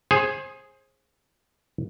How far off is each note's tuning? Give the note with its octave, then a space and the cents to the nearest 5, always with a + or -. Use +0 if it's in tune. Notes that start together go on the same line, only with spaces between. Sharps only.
G#4 +0 C5 +30